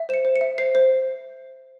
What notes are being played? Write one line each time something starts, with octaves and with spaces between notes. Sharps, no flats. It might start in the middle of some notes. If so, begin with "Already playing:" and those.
Already playing: E5
C5 C#7 E7
C5
C#7
E5
C5 C7
C5